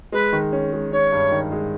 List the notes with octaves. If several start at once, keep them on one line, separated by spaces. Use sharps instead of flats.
G#3 B4
D#3
C#4
G#3
C#4 C#5
G2
D#3
G#3